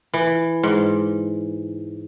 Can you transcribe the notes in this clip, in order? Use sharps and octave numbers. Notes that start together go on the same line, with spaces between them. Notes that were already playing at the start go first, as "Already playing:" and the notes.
E3
G#2